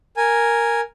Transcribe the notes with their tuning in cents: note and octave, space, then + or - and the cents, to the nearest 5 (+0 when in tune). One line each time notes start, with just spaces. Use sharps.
A#4 +0 G#5 -5